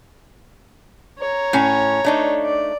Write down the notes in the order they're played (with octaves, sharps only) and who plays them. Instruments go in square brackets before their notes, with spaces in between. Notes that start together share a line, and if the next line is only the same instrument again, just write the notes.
[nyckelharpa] C#5 A#5
[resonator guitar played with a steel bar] A2 C#4
A3 D4 D#4
[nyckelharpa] D5